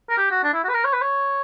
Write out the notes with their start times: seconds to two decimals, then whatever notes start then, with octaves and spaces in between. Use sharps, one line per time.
0.10 A#4
0.18 G4
0.31 F#4
0.44 D4
0.54 E4
0.64 F#4
0.69 B4
0.74 A#4
0.84 C#5
0.93 B4
1.02 C#5